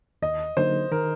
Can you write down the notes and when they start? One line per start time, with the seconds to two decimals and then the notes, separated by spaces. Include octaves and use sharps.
0.22 D#2 D#5
0.57 D3 F#3 A#3 D#4 C5
0.91 D#3 A#4